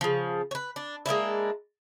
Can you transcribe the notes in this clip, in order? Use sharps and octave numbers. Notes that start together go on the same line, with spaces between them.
C#3 F3
B4 C#5
D4
G#3 A#3 D4 E4